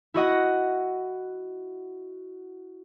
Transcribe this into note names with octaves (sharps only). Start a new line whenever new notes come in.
E4 F#4 D#5 F#5